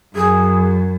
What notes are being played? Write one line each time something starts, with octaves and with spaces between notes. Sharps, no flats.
F#2 G#4